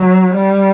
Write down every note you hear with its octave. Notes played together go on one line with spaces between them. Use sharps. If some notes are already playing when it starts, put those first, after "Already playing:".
Already playing: F#3
G3